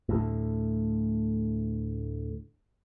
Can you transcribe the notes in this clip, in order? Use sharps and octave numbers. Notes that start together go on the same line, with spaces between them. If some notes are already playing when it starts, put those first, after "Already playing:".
D2 A2